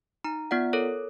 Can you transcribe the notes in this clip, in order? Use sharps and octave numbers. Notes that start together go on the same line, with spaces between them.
D#4 A#5
B3 F4 D5 F#5
A4 A#4 C#5